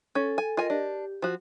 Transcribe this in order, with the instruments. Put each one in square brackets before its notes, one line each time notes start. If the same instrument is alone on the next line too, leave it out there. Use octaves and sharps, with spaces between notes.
[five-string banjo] C#4 [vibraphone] A4
[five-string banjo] G#5
[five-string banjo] F4 G#5 [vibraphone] A#4 D#5
[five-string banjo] D4 [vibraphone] G4
[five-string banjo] F3 F#4